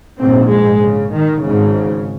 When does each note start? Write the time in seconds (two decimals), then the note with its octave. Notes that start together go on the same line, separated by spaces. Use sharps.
0.19 A#1 G#2 C4
0.50 G#3
0.82 C#3
1.12 D#3
1.43 G#1 G#2 C#3